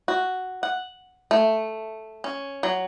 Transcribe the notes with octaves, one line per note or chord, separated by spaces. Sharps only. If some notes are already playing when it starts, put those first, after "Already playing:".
F#4
F#5
A3
C#4
F#3